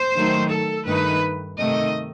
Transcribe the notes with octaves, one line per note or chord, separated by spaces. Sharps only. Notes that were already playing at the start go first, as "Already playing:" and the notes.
Already playing: C5
D#3 F#3 A3 D#4
A4
G2 D#3 A3 D#4 B4
C3 D#3 A3 D#5